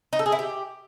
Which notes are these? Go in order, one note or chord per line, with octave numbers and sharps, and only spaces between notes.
D#4
A4
G#4
E4
G4